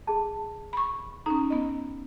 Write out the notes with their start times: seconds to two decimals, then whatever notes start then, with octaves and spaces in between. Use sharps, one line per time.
0.07 G#4 A5
0.73 B5 C#6
1.26 C#4 D#4 A#5
1.50 B3 D#5